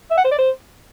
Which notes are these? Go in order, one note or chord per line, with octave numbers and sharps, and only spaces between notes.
E5
F#5
C5
D5
C5